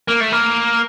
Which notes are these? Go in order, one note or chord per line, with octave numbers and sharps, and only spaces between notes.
A#3
A3
A#3